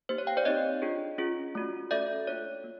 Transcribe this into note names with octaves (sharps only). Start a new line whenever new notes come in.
A#3 D#4 G4 C5
C#5
F5 G5
C5 D5
C4 D#4 G4 C#5 D#5
D4 F4 G#4
C#4 F4 G#4
A3 C#4 F#4
A3 C#4 F#4 A4 D5 E5
A#3 D4 F4 A4 C#5
A#3